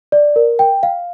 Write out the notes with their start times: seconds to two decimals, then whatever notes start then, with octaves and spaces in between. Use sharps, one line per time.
0.12 D5
0.36 A#4
0.59 G5
0.83 F5